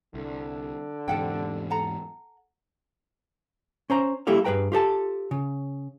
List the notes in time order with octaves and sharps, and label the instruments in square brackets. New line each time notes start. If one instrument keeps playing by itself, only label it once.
[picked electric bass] C2 [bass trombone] D3
[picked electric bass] E2 G#2 C3 [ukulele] A4 F#5 G5
[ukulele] A4 F#5 A#5
[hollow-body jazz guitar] C#4 C5 A#5
G3 A#3 E4 G4 A4 F5
G2 G#4 B4 G5 A#5
F4 G4 A4 A5
C#3